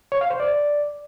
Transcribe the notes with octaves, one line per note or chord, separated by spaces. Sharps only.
C#5
F5
C5
D5